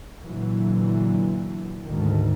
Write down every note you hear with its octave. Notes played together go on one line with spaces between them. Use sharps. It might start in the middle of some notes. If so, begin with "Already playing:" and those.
A#2 D3 E3 F#3
D2 G#2 D#3